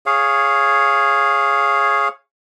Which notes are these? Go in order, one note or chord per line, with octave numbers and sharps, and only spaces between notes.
G#4 C#5 F5